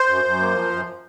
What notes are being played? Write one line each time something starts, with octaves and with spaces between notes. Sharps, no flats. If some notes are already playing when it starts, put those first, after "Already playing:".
Already playing: C5
F#2
F#2
A#3
F3
F#2